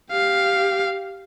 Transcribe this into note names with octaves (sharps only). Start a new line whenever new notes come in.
G4 F5